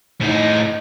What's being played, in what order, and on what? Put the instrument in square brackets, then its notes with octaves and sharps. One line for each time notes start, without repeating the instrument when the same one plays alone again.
[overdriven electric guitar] A2 D#4